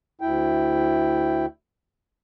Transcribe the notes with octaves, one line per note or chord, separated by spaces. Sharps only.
D2 E4 G5